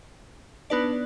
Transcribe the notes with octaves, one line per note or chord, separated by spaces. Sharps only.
B3 D4 D#4 B4 D5